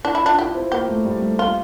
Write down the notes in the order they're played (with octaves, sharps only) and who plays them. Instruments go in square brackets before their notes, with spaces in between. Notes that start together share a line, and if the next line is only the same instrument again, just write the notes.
[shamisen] D4 [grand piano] E4
[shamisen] E4
[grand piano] F4
[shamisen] D4
[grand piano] E4 [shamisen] G4
[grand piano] C4
[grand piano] A#3 [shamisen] G4
[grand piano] A3
G3
A3
[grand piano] A#3 [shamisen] F4